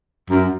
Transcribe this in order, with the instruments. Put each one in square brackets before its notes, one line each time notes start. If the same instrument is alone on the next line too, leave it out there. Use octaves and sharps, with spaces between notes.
[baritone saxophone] F#2